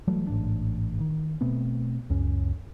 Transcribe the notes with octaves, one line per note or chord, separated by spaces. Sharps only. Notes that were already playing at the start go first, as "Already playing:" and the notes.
E3 F#3 G3 A3
A1 G#2 A3 D4
D#3
B2 A3 B3 C4
C#2 F#2 C#4